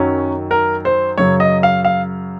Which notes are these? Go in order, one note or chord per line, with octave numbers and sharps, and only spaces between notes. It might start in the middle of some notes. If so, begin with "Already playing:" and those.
Already playing: F#2 D#3 F#3 C#4
A#4
C5
F#2 C#3 F#3 C#5
D#5
F5
F5